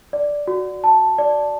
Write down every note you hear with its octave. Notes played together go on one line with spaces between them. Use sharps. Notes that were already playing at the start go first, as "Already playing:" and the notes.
D5
F#4
A5
D5